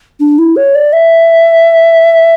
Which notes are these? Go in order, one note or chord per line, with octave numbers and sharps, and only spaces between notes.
D4
E4
C#5
D5
E5